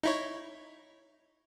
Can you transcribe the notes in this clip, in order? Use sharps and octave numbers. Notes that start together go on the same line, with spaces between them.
D#4 E4 C#5